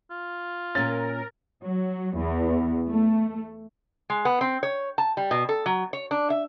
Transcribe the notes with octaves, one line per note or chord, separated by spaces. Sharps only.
F4
A#2 C#4 A#4 A6
F#3
E2
A3
G#3
B3
C4
C#5
A5
G3
B2
A4
F#3
C#5
D4
E5